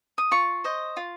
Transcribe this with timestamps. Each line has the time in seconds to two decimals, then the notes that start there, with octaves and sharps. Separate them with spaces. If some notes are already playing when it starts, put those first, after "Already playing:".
0.18 D#6
0.31 F4 C#6
0.64 C5 D#5
0.97 F4